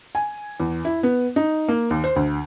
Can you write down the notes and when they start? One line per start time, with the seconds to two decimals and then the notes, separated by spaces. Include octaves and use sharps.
0.15 G#5
0.60 E2
0.85 E4
1.03 B3
1.36 D#4
1.68 A#3
1.91 D#2
2.04 C5
2.16 D2